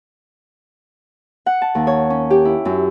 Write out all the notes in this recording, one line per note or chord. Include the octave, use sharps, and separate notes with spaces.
F#5
A5
D#2
C#5
C#4
G4
E4
F#2